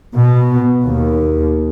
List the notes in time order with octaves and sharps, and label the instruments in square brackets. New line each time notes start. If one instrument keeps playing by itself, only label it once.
[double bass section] B2
D#2